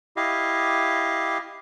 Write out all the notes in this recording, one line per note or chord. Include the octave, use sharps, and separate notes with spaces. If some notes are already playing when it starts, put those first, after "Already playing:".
E4 G4 D#5 F5